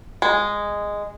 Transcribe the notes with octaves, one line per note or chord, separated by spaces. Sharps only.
G#3